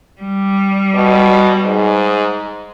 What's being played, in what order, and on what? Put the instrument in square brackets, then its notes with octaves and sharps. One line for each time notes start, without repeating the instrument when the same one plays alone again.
[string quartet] G3
[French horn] B2
G#2